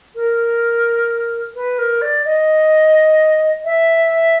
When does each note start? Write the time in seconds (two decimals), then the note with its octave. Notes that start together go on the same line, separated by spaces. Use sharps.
0.15 A#4
1.55 B4
1.78 A#4
2.01 D5
2.25 D#5
3.64 E5